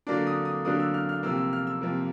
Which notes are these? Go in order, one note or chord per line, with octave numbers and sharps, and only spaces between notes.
D3 F#3 A#3 D4 D6
D#6
D#6
D3 F#3 A#3 D4 D#6
E6
F6
F6
C3 F3 A#3 E6
E6
F6
E6
C3 F3 A#3